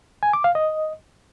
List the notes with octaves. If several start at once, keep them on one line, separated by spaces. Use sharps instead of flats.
G#5
D6
F5
D#5